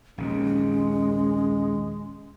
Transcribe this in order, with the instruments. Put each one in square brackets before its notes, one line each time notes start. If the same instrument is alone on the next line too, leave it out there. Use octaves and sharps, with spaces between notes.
[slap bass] A#1 D#2 C3 [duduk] G#3 [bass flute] C#4